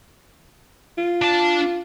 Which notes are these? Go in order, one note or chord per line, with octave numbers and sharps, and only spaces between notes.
F4
D4 A5